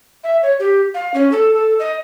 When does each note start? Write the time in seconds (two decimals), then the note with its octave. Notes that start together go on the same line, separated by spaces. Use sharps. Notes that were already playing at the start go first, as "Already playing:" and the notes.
0.24 E5
0.43 C#5
0.59 G4
0.94 F5
1.14 C#4
1.32 A4
1.54 A4
1.79 D#5